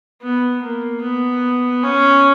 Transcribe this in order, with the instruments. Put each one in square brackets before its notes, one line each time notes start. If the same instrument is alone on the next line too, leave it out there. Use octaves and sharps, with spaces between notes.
[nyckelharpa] B3
A#3
B3
C#4